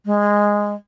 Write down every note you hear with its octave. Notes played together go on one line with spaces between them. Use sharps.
G#3